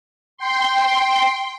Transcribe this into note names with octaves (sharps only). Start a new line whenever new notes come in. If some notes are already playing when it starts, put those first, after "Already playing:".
G5 C6